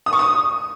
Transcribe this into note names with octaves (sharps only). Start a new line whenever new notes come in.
D#6
C#6
D#6